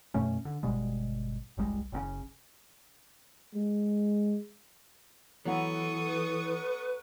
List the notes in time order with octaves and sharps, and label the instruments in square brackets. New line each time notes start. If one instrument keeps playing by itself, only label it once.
[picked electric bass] F#2 B2 A3 C#4
D3
G1 B2 G3 G#3
F#1 C2 G3 G#3
F#1 A#2 C#3
[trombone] G#3
[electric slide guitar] E3 [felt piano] F#3 B3 F#5 [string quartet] A4 C#6 D#6
[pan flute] B4